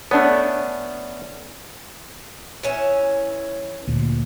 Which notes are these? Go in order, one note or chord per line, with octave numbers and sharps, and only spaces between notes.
A3 B3 C#4 D4
E3 C#4 E5
D2 A#2